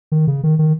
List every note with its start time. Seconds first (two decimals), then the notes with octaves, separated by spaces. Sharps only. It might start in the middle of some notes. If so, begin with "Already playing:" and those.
0.12 D#3
0.27 C#3
0.43 D#3
0.59 D#3